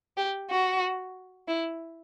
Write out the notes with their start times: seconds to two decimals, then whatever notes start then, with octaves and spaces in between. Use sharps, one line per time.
0.17 G4
0.50 F#4
1.48 E4